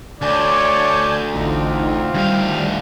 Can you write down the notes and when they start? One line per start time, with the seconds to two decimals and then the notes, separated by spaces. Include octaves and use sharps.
0.22 D2 C#5 D5 G#5 A5 G6
1.34 A1 D3 C4 D#4 F4
2.14 D2 D#3 G3 F5